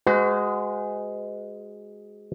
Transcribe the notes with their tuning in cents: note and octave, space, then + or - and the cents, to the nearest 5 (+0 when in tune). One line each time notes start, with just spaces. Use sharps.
G#3 +0 F#4 +5 C5 -45